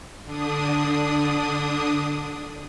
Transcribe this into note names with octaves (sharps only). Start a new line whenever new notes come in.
D3 D4 D#6